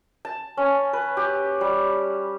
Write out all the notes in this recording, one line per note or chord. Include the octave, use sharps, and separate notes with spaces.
A5
C#4
B4
G4
G3